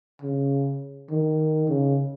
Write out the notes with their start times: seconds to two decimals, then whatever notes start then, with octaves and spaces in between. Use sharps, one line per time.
0.22 C#3
1.10 D#3
1.69 C#3